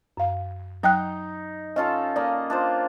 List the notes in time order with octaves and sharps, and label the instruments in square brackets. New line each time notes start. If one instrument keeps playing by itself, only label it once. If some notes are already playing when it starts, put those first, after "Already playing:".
[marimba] F#2 F5
[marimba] F#3 G5 F#6 [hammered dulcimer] D#4
[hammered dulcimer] C#4 F4 A4 [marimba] D#5
[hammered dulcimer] A#3 D#5 [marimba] D5
[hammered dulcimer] D4 F4 C5